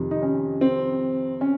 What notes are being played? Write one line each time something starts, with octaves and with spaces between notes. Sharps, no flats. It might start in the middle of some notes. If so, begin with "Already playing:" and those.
Already playing: F2 C3 D#3
D#4
C#4
C4
C#4